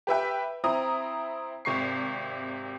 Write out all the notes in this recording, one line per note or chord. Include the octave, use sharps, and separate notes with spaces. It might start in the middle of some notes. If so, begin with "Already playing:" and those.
G4 B4 E5 G5
C4 E4 A#5 D#6
G#1 C3 C#6 C7